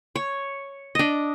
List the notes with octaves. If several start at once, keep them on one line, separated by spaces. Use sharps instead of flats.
C#5
D4 D#5